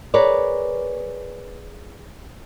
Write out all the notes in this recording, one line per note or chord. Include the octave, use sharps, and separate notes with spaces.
G#4 A#4 B4 C#5 D5